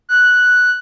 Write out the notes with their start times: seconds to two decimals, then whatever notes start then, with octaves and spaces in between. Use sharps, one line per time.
0.09 F#6